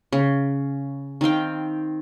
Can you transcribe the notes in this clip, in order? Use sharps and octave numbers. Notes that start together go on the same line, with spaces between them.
C#3
D#3 C4 F5 G5